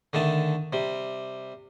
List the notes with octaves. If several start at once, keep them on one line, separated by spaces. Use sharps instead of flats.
D3 D#3 A3 A5
C3 G3